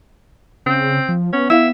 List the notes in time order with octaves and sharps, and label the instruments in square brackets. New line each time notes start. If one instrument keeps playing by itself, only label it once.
[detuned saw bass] C#3 [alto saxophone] C4
[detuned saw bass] F3
[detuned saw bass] B3 [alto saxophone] C#4
[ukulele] E4 F5 [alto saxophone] E5